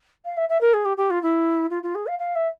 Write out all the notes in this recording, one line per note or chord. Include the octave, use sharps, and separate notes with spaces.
F5
E5
E5
A#4
G#4
G4
G4
F4
E4
F4
F4
G#4
F5
F5
E5